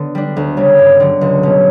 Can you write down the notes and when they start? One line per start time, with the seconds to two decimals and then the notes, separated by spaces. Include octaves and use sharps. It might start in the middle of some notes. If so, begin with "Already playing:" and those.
Already playing: D3 B3
0.15 G3 D4
0.37 D2
0.57 C#3 G3 C#4
0.79 G2
1.00 D3 F#3
1.21 C#2
1.43 B2 G3 C#4